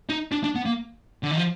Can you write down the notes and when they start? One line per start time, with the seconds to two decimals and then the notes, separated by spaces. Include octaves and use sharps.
0.09 D#4
0.32 D4
0.44 D4
0.55 B3
0.65 A#3
1.23 D3
1.31 D#3
1.37 F3